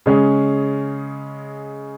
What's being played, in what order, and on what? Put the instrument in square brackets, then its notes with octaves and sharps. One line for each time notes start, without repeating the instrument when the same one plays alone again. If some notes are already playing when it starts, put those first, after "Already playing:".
[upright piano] C#3 G#3 C#4 G#4